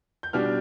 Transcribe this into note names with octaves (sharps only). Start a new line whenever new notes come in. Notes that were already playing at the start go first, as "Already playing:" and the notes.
G6
B2 G3 D4 F6